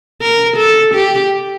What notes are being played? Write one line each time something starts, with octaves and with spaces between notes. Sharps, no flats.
A#4
A4
G4